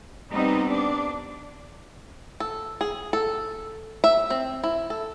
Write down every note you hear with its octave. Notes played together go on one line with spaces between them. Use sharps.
G3 B3 C4 D#4
D4
A4
G#4
A4
E5
C4
E4
A4